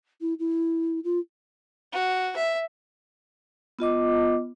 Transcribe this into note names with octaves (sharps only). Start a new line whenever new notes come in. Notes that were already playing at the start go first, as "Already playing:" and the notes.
E4
E4
F4
F#4
E5
B3 F4 D#5 D6